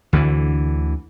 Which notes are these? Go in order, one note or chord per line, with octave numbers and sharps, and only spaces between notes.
D2 D3 E3